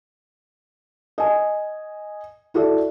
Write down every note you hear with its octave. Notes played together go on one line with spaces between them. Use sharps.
D#5 G#5
E4 F#4 A4 D5 E5